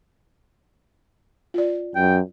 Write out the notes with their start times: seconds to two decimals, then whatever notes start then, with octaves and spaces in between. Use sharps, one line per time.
1.54 F4 D5
1.95 F#2 G5